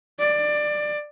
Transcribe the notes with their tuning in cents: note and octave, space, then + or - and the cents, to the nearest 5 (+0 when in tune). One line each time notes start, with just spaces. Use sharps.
D5 +20